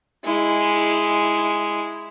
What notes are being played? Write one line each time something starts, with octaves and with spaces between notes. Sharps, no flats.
G#3 E4